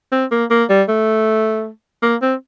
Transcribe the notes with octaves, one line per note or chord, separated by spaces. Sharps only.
C4
A#3
A#3
G3
A3
A#3
C4